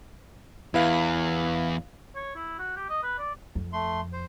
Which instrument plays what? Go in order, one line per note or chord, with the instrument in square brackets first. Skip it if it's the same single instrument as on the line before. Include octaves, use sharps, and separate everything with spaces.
[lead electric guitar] E2 [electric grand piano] E4 B4 F5
[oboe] C#5
E4
F#4
G4
D#5
B4
D5
[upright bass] F2
[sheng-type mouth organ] A3 C6
C5